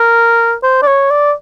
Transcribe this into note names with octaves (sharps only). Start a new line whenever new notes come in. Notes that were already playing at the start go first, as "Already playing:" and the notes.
Already playing: A#4
C5
D5
C#5
D5